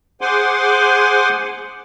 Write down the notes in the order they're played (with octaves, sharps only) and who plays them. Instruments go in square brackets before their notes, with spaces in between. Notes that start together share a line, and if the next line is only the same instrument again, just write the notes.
[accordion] G#4 C5 F#5 G#5 C6 D6